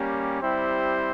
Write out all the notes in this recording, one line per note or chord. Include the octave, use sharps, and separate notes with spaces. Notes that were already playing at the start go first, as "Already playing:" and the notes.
Already playing: G3 A#3 C#4 G4
G3 C4 E4 G4 C5